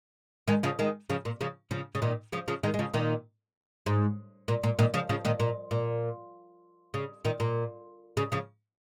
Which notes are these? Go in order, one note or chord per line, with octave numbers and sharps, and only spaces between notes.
D#3 G#3
C#3 F3
D#3 G#3
C#3 F3
A#2
C#3 F3
C#3 F3
C#3
A#2 D#3
C#3 F3
C#3 F3
D#3 G#3
G#3
C#3 F3
A#2 D#3
G#2
A#2
A#2
A#2 D#3
C#3 F3
C#3 F3
A#2 D#3
A#2
A#2
C#3
A#2 D#3
A#2
C#3
C#3 F3